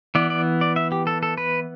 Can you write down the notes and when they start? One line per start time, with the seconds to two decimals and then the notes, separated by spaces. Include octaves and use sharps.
0.15 E3 B3 D5
0.30 D5
0.61 D5
0.76 E5
0.92 G4
1.07 A4
1.23 A4
1.38 B4